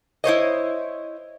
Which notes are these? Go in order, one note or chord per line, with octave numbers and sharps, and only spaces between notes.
E4 C5 C#5 D#5